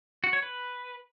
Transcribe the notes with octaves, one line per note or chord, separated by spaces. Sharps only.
F#4
C#5
B4